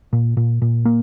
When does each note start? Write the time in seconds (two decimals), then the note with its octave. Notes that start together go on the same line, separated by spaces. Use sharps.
0.13 A#2
0.37 A#2
0.62 A#2
0.85 A#3